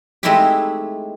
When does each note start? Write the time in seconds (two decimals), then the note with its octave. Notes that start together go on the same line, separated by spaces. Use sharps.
0.23 G#3 A3 C4 D#4 E4 G4